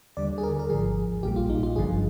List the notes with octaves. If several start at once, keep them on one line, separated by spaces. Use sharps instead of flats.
D#2 D3 G3 D5
G#4
A#4
A#4
G#1 G#2 F3 G#4
A#1 A#2 G3 G4
F4
D#4
F4
G1 G2 D3 F3 G#4